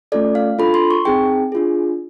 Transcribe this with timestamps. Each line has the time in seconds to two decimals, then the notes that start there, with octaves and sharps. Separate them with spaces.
0.12 A3 C#4 F4 A4 D5
0.35 F5
0.59 D4 F4 A4 B5
0.74 C6
0.91 C#6
1.05 C4 D#4 G#4 G5
1.52 D4 F4 G#4